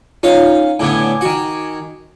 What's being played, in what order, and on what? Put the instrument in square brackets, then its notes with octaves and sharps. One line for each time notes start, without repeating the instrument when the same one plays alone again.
[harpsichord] C#4 F5 [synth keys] D#4 F4
[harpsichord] A2 D3 B3 [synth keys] G#5 D6 G#6
[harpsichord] D#3 F#4